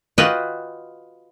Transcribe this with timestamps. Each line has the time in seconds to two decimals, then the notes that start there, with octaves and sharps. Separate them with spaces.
0.18 F4 F#4 B4 D#5 F#5 G5